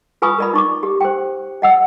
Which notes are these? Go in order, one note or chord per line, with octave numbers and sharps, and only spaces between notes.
F4 B4 G#5 B5 C#6 D#6
A#4 D5 B5
D#4 C#6 D6
G4
C5 G5
D#5 F#5 E6